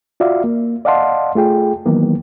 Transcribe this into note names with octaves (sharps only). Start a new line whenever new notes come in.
F4 F#4 D5 E5 F5
A#3
D5 D#5 F5 F#5 A5 C6
A3 F4 G#4 G5
D#3 E3 F#3 A#3 B3